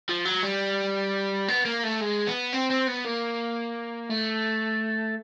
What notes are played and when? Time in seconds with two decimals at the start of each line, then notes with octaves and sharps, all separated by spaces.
0.09 F3
0.25 F#3
0.43 G3
1.48 B3
1.65 A#3
1.83 A3
2.01 G#3
2.27 B3
2.53 C4
2.71 C4
2.88 B3
3.06 A#3
4.10 A3